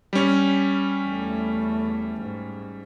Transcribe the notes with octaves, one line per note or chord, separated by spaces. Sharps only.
G3 C#4
E2 A3
G#2